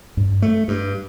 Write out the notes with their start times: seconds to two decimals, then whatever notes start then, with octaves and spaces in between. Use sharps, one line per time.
0.17 G2
0.42 A3
0.68 G2